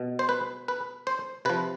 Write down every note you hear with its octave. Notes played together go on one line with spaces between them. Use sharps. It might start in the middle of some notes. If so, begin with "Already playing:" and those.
Already playing: B2
C5
B4
B4
C5
C3 F3 B4